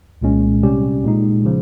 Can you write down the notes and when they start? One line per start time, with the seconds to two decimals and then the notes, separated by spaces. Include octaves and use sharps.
0.22 C2 A#2 G#3 C#4
0.63 C3 G3 C#4 G4
1.04 A#2 G#3 D#4
1.45 C#3 F3